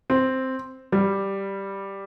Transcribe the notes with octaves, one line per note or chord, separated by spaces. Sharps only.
C4
G3